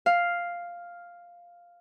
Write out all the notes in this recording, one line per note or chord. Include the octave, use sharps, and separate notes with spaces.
F5